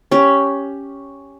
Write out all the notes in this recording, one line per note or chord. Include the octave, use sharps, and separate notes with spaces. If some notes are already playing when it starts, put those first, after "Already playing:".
C#4 G4